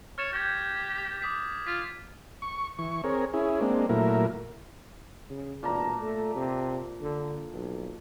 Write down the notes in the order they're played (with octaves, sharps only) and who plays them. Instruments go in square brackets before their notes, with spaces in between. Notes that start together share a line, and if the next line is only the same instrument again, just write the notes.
[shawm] C#5 [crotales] F6 A6 E7
[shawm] G4 [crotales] G6 G#6
[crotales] D6 D#6 B6
[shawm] F4 [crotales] B6
[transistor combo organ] C#6
E3 C#6
C4 G#4 A#4 C#5
C#4 E4 G#4
G#3 A#3 C4 D4
A#2 F#3 A3 E4 A#4
[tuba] C#3
[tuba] E1 [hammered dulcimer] A#2 A5 A#5
[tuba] A3
C3
D3
B1